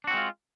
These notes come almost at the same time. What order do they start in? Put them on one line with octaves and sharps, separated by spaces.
D4 F#4 C4 G#3 F4